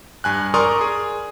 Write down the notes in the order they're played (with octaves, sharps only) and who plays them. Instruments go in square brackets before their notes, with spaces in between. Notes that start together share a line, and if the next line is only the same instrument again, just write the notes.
[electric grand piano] G2 G#5 F#6
A#4 D5 A#5 C6 C#6 D#6
G#4